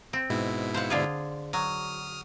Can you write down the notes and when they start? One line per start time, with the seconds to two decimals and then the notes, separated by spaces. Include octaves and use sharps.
0.13 C4
0.30 G#2 B2 E4
0.74 C5 F5 F#5
0.90 D3 F4 G#4
1.53 F#3 D#6 F6